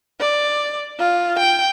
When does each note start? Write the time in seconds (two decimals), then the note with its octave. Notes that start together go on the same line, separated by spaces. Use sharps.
0.20 D5
0.99 F4
1.39 G5